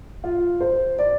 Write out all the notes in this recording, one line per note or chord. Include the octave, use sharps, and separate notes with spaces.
F4
C5
D5